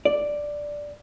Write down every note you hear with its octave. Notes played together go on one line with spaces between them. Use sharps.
D5